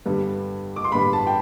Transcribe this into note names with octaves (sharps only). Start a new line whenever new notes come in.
G2 D3 G3 B3
D6
C6
G2 D3 G3 B3 B5
A5
G5